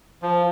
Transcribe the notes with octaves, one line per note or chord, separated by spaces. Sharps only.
F3